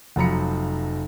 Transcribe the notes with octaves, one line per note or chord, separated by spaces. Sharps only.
F1 F3 F#3 A#5 B5 C#7